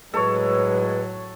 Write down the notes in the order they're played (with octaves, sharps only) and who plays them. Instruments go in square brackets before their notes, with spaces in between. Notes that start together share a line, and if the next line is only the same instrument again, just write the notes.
[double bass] A2 F#3 [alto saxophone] G#3 [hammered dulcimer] A4 C#5 [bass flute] B4